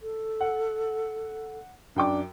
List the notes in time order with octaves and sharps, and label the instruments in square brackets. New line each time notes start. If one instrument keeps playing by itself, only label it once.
[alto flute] A4
[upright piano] F#5
[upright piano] F#2 G5 D6 [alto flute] D4